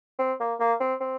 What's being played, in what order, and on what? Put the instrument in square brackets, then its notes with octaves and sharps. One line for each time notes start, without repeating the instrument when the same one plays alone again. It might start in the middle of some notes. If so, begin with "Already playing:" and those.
[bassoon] C4
A#3
A#3
C4
C4